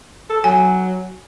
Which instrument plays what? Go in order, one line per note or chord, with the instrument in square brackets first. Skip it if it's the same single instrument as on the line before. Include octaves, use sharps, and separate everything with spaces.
[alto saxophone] A4
[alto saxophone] F#3 [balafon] G#5